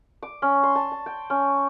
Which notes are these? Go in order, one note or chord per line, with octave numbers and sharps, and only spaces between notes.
D6
C#4
C6
A5
A5
G5
C#4